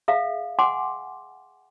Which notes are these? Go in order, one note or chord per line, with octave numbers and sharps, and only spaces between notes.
G#4 E5 F5
F#5 G#5 C6 D6